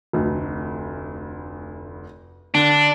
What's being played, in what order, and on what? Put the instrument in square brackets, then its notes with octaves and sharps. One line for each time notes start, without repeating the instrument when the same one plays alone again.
[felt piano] F1 D2
[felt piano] D3 [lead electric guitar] D4